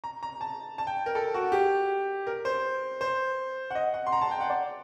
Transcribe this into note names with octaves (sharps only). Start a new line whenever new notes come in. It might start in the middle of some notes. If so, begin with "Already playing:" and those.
A#5
A#5
A5
A5
G5
A#4
A4
F#4
G4
A#4
C5
C5
F#5
D#5
F#5
C6
A#5
A5
G5
F#5
D5